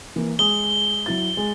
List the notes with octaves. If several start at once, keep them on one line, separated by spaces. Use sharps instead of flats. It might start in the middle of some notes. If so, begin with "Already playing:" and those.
E3 A#3
G#3 D#6 G7
F#3 E4 A6
G#3